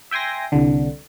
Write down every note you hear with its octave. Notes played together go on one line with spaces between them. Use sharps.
E5 G5 G#5 C6 A#6
C2 D3